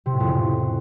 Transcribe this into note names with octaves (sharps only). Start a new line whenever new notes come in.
C3
A2
F2
C#3
A2